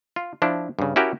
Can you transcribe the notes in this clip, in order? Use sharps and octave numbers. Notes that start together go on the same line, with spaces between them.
F4
F3 D4 E4
G2 C#3
C#4 E4 F#4 G4 A#4